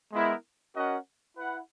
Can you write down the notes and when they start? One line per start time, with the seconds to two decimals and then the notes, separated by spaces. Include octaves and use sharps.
0.12 G#3 B3 E4 A#4
0.76 C#4 F#4 A#4 D#5 F#5
1.38 E4 B4 F#5